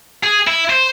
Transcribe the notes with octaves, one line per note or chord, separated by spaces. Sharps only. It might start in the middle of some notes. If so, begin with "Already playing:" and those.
G#4
E4
C5